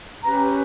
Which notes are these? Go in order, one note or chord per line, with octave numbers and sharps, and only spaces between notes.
C#4 G4 B4 A#5